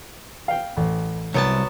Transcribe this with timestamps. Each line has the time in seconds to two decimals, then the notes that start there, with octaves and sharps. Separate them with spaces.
0.48 F5 G5
0.77 A1
1.34 C2 F#3 B3 A5